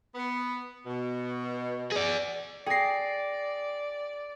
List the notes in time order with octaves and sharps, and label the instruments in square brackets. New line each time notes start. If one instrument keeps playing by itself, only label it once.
[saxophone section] B3
B2
[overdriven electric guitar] G#4 D5
[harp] G#4 C7 [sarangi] D5 [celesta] G5 A#6